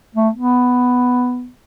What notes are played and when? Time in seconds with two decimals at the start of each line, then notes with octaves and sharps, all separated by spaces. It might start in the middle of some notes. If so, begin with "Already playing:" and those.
0.15 A3
0.34 B3